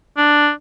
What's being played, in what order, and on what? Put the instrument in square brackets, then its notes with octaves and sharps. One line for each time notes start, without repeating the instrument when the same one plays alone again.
[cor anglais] D4